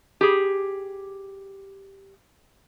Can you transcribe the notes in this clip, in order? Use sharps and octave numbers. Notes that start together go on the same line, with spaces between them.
G4 G#4